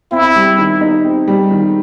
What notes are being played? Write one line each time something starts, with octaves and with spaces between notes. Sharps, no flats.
C4 E4
G3
D#3
D#4
C4
G3
D#3